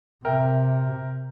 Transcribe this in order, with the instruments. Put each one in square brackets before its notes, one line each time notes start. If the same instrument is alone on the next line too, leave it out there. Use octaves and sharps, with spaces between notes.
[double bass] C3 [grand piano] A#4 E5 G5